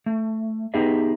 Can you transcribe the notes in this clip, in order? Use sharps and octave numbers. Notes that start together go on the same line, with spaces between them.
A3
B3 D#4 G4 G#4 D#5 E5